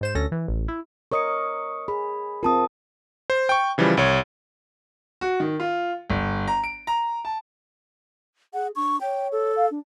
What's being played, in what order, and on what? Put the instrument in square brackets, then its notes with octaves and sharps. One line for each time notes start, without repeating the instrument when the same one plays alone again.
[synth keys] G#2 C5 E7
D2 C#4 A4 A#6
E3
A1
E4
[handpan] A#4 C#5 D#5 [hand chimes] C#6 D#6 C#7
[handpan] G#4 [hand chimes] B5
[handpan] C4 F4 [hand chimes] A#4 A5 D#6
[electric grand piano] C5
G5 C#6
C#3 E3 F3 G3
C2 C#5
[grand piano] F#4
D#3
F4
G1
A#5
D7
A#5
A5
[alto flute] G#4 [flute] F#5
[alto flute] D4 [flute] C#6
[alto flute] C#5 [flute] G5
[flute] A4
[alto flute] F5
D4